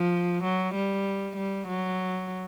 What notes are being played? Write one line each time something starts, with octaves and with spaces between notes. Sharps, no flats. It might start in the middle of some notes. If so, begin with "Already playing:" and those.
Already playing: F3
F#3
G3
G3
F#3